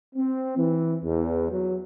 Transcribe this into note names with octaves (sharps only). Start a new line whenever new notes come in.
C4
E3
E2
F#3